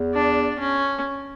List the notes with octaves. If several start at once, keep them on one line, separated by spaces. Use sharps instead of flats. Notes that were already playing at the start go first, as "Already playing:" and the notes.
Already playing: E2
D4
C#4